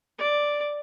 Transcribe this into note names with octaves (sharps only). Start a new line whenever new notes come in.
D5